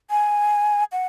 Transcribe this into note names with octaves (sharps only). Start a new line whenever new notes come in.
G#5
F#5